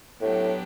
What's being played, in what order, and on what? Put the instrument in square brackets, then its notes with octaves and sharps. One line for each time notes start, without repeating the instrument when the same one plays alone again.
[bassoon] A2 [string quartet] F#3 B3 D4 G4